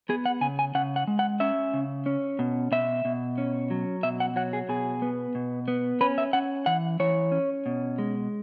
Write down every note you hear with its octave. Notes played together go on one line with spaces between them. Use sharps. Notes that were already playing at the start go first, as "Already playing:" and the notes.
B3 G#4
F#5
C#3 G#5
G#5
C#3 F#5
F#5
G#3
F#5
C#4 E5
C#3
C#4
B2
B2 E5
B2
C#4
F#3
B2 E5
F#5
F#3 F#5
G#4
B2 G#4
B3
B2
B3
C#4 B4
E5
C#4 F#5
E3 F#5
E3 C#5
C#4
B2
G#3